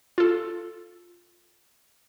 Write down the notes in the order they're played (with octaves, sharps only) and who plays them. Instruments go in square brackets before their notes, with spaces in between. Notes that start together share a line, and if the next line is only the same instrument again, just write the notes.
[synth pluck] F4 A4